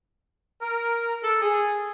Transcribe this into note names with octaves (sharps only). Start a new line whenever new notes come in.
A#4
A4
G#4